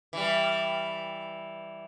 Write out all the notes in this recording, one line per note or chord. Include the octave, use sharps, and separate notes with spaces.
E3 G3